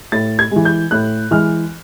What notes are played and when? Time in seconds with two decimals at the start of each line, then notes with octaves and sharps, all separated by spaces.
0.12 A2 A6
0.39 G#6
0.51 E3 G#3
0.65 G6
0.91 A2 F#6
1.31 E3 G#3 F6